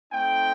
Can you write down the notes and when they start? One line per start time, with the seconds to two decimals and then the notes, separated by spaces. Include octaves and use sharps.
0.12 A3 C4 D#4 G5